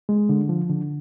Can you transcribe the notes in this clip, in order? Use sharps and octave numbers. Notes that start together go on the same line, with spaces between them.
G#3
D3
F3
D3